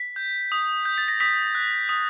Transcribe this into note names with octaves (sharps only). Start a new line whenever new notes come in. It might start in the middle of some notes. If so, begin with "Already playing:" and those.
Already playing: B6
G6
D#6
G6
A6
A#6
D#6 B6
F#6
D#6